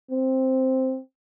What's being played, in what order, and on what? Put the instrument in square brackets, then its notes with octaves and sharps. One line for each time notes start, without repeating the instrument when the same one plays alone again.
[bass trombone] C4